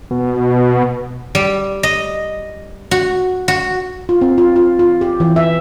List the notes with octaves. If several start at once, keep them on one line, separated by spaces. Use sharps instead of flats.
B2
G3
D#5
F#4
F#4
F4
C4
F4
F4
F4
G4
E3
E5